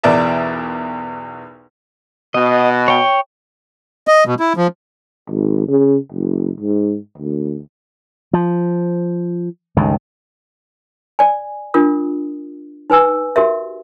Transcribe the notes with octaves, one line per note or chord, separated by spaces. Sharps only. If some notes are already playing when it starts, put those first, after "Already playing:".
B1 E2 A#4 D5 E5 A5
B2 D#5
C#5 G5
D#5
B2
E4
F3
G#1
C#3
F#1
G#2
D2
F3
C#2 G2 D#3
D5 G#5
D4 F4 A#4 D#6
D#4 B4 G#5 E6
F#4 G4 A#4 E5